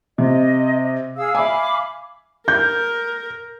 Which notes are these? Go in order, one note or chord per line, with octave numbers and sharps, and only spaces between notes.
C3 D#5
G#4 F5 E6
E5 F5 G#5 B5 D6
A#4 G6